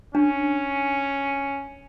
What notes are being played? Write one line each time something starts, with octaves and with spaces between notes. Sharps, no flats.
C#4 D4